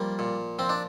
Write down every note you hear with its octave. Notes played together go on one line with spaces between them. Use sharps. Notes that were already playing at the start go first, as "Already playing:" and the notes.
Already playing: F3 G3 A#3
A#2
F3 C4
D4